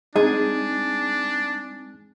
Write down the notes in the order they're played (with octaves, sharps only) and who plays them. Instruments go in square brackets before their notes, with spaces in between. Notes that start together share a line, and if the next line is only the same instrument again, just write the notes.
[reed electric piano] G#3 C4 D#4 [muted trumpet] D4 [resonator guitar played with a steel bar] G#4